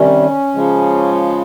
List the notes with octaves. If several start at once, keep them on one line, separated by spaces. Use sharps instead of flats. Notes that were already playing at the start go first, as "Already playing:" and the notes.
Already playing: C3 D#3 G3 C#4
C#3 F3 G#3